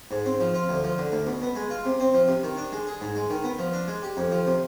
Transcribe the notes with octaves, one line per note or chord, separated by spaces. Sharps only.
G#2
C4
F3
F4
D2
F3
D3
D2
B2
B3
G#3
F4
C3
C4
F3
C3
D#3
D4
G#3
G#4
G#2
G#3
D#3
B3
F3
D4
G#3
G4
F2
F3
C3